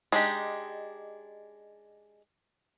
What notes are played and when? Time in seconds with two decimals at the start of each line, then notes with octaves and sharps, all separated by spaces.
0.12 G#3 D4 D#4 G4